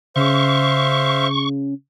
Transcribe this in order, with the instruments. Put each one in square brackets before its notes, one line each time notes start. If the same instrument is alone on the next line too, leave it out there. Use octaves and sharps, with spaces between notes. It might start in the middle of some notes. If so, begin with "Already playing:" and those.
[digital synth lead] C#3 [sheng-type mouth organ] C5 E5 F5 [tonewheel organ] C#6